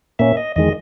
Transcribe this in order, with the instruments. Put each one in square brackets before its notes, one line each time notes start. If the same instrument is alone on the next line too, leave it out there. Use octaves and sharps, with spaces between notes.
[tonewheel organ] A#2 A#3 C#4 E5
D#5
E2 D#3 G#3 D#5